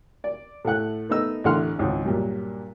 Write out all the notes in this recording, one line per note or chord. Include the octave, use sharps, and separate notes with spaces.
D5
A2 A3 F#5 F#6
A3 B3 D#4 D#5 E6
A1 E2 D3 F#5 C6 F6
G#1 C#2 G#2
G2 A#2 F#3